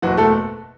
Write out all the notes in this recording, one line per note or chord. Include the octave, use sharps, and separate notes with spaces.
F#1 E2 B2 F#3 F#4
A3 A4